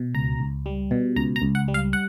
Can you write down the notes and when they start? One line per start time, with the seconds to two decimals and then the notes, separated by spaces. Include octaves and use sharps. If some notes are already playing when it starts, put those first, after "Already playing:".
Already playing: B2
0.15 C#2 A#5
0.40 C#2
0.66 G3
0.91 B2
1.16 C#2 A#5
1.36 A#5
1.42 C#2
1.55 F#5
1.68 G3
1.74 F5
1.93 F#5